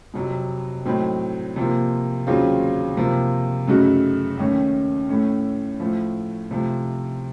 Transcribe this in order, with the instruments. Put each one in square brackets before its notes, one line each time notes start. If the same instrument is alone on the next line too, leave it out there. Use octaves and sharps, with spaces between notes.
[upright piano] F2 C3 F#3
A2 F#3 C4 D#4
C3 F3 A#3
D#2 C#3 F#3 C4 F4
C3 F3 A#3
F#2 C#3 A3 D#4 F#4
D#2 D#3 A3 C#4
A2 A3 C#4
A2 F3 A3
C3 F3 A3